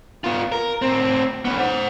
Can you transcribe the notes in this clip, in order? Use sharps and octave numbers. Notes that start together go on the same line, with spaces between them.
B3 F4
A#4
A2 C4
B3 C#4
C5 F#5